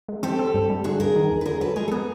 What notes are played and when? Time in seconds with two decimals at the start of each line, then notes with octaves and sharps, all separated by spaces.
0.08 G#3
0.23 C4 G4 A4
0.39 C4
0.54 G2
0.70 G3
0.84 D3 F#4 G#4
1.00 G2 G#4 A#4
1.16 D#3
1.31 E2
1.41 B4
1.45 D3 G#4 A#4
1.61 F#3 A4 B4
1.76 G#3 G#4 A#4
1.88 A4
1.91 B3 G#4 A#4